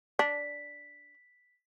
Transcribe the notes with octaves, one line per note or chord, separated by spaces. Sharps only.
D4 B6